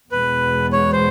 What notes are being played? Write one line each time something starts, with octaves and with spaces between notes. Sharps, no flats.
E2 B2 G#3 B3 B4
C#5
C5